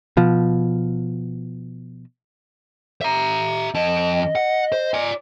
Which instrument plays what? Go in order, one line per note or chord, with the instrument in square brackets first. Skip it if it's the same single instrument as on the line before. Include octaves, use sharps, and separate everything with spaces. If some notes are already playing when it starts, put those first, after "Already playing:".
[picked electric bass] B2 F3
[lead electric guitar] E5 A#5
[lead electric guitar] F2 A5 [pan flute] D#5
[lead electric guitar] F#5
C5
D5 G#5